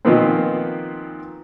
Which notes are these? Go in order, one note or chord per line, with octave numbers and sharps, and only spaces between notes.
A#2 D#3 F3 B3 C4